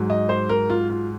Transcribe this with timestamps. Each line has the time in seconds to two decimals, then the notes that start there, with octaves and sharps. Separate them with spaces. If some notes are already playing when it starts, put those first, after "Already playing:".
Already playing: G#2 F#3
0.10 D#5
0.29 C5
0.49 A#4
0.70 F4
0.90 F4